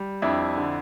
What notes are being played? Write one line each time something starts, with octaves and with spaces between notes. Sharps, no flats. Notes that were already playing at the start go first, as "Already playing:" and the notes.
Already playing: G3
F2 D4 E4
D3